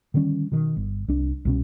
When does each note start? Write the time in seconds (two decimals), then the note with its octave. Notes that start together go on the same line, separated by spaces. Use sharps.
0.14 D3 D#3 G3 C#4
0.52 B2 D#3
0.77 G1
1.08 C2 D4
1.45 C2 B2 C#4